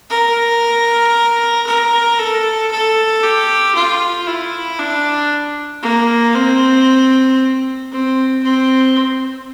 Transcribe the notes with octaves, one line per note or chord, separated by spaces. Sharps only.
A#4
A#4
A4
A4
G4
F4
E4
D4
A#3
C4
C4
C4